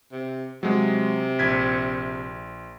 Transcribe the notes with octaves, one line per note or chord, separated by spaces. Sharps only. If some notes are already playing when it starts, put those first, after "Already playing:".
C3
C3 F#3 G#3
A#1 G#6 B6